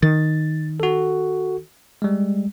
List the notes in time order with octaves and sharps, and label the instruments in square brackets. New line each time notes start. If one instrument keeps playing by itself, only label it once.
[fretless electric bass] D#3 [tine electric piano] A6
[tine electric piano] F#4 A4
G3 G#3